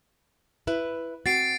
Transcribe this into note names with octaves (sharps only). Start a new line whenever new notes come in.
E4 B4
C4 F#4 A6 C7 D7